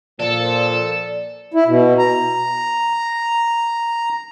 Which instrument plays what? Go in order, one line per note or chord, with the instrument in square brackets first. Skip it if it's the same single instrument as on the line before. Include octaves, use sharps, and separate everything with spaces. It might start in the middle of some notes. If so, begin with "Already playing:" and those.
[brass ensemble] A#2 F3 [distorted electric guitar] A4 [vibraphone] D5
[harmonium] E4
B2
A#5